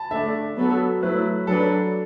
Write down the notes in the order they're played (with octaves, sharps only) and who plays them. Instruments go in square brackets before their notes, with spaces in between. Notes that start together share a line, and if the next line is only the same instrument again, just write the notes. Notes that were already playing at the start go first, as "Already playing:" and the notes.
Already playing: [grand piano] A5 B5
[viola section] D3 A3 D4 [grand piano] E5
[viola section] F#3 B3 F#4 A4
[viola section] F#3 A3 E4 [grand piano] B4
[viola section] F#3 D4 B4 [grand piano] A4